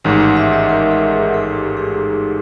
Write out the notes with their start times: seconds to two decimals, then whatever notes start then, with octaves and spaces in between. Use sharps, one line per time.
0.04 A1 G#2 D#3 F#5
0.20 F#5
0.37 E5
0.53 D#5
0.69 A#4
0.91 A4
1.12 G#4
1.34 A4
1.55 G4
1.77 G#4